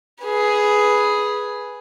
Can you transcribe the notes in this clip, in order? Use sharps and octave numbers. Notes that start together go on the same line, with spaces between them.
G#4 B4